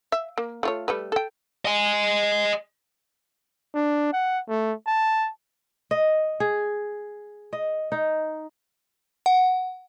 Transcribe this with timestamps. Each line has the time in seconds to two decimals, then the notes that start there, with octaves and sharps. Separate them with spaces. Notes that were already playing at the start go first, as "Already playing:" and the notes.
0.12 E5
0.38 A#3
0.63 A3 F4 C#5
0.88 G3 A3 B4
1.12 A4 G5
1.65 D#5 G#5
3.74 D4
4.13 F#5
4.49 A3
4.87 A5
5.91 D#5
6.40 G#4
7.53 D#5
7.92 D#4
9.26 F#5